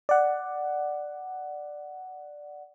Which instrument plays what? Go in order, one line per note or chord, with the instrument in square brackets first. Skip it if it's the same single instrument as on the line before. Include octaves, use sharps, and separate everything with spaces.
[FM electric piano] D5 F#5